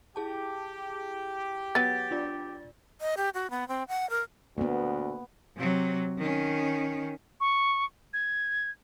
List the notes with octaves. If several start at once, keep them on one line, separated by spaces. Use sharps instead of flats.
E4 G4 G#4 A5
F#3 B3 A6
D4 F4 D5
D#5
G4
F#4
B3
C4
F#5
A#4
D2 A#3 B3
C3 F#3
D#3 C#4
C#6
G#6